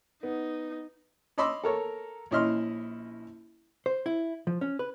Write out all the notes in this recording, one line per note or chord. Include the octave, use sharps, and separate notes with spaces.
B3 D#4
C#5 D#5 B5 C6 D6 E6
A4 A#4 C#5
A#1 C#4 E4 D#5 C6 F6
C5
E4
F3
C#4
B4